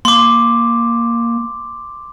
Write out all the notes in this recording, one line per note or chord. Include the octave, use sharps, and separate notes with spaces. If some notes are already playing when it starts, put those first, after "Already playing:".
A#3 C6 D6